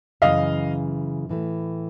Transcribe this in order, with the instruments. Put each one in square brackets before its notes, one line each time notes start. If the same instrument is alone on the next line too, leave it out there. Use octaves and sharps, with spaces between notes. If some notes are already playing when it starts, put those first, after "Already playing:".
[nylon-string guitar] F#2 C#3 E3 [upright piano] D#5 F5
[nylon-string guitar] A2 E3 A3